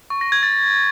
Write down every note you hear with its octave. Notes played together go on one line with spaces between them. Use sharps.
C#6
A#6
G#6
A6